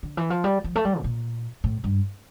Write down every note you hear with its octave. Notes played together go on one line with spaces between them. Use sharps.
D3
E3
F3
G3
F3
A3
G3
A2
A#2
A2
G2